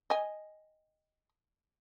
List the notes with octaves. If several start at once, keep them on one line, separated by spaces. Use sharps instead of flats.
D#5 G#5